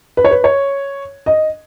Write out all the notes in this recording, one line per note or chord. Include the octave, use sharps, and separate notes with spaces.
B4
C#5
B4
C#5
D#5